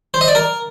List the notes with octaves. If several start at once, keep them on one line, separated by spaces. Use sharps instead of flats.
C5
D#5
D5
A#4